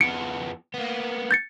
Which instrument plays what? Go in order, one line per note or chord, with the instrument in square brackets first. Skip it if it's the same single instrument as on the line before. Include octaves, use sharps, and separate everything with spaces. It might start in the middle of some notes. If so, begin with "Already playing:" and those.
[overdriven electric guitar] F2 B3 [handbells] C#7 D7
[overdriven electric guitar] A#3 B3
[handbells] G6 A6 C#7